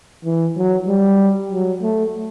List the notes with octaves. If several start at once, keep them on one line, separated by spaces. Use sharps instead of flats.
E3
F#3
G3
F#3
A3